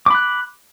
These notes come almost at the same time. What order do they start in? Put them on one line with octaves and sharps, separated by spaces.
D6 B5 F#6